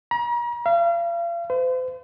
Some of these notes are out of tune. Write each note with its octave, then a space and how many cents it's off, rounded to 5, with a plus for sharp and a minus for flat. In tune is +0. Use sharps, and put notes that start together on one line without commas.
A#5 +40
F5 -40
C5 -45